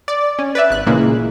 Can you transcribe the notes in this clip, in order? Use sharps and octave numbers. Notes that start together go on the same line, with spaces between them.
D5
C#4
B4 D5 E5
G#1 F#6
A#2 C#3 E3 G#3 A#3